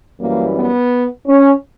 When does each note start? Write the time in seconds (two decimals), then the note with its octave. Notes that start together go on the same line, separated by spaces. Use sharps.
0.19 F#2 E3 G3 A#3
0.56 B3
1.27 C#4